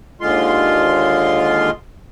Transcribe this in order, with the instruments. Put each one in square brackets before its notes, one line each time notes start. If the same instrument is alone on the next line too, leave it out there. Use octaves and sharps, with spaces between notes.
[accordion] D#2 D3 G#3 F4 C6